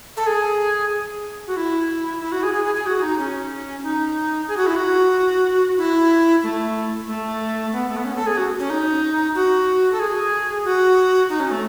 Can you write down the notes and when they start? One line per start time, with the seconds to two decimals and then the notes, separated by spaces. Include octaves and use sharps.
0.17 A4
0.26 G#4
1.47 F#4
1.56 E4
2.21 E4
2.32 F#4
2.43 G#4
2.53 G#4
2.64 G#4
2.75 G#4
2.86 F#4
3.02 D#4
3.18 C#4
3.83 D#4
4.48 G#4
4.57 F#4
4.66 E4
4.76 F#4
5.77 E4
6.43 A3
7.07 A3
7.72 B3
7.88 A3
7.96 B3
8.04 C#4
8.16 A4
8.26 G#4
8.37 F#4
8.59 C#4
8.70 D#4
9.35 F#4
9.92 A4
10.00 G#4
10.64 F#4
11.29 D#4
11.40 C#4
11.51 A3